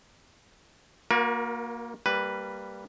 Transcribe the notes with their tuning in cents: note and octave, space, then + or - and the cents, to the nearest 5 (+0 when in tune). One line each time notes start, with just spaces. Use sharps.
A#3 +0 F#4 -30 A#4 +35
G3 +0 A#3 -20 B4 +0